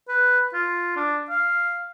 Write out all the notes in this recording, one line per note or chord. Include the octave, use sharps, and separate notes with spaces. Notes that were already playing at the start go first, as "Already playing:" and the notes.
B4
F4
D4
F5